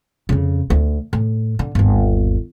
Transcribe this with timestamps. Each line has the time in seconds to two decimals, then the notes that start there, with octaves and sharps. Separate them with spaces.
0.29 F2 C#3
0.70 D2
1.13 A2
1.59 D3
1.75 G1 D#2